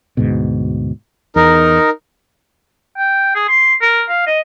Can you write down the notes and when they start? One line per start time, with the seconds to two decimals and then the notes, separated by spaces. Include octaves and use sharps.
0.17 D2 G#2 B2
1.36 E2 D#4 A#4
2.98 G5
3.35 G#4
3.49 C6
3.82 A#4
4.09 F5
4.27 D#5